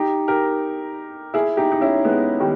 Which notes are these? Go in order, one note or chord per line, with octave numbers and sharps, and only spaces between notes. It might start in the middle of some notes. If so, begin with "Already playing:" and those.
Already playing: D#4 G4
G4 A#4
E4 G#4
D#4 G4
D#4
C#4 E4
G#3 B3
D#3 G3